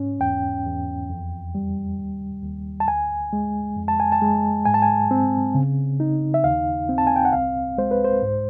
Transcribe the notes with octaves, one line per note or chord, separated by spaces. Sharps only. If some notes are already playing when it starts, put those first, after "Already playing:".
Already playing: G#2 C#4
E2 G5
E2
F2
G3
D#2
D#2
A5
D2 G#5
G#3
F2
A5
G#5
A5
G#3
G#2 G#5
A5
G#5
C4
C#3
D#4
E5
D#2 F5
C4
A5
G#5
G5
F#5
C2 F5
G#3 C5
B4
C5
G#2